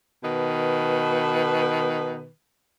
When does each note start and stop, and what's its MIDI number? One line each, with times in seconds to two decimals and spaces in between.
0.23 2.28 47
0.23 2.28 51
0.23 2.28 71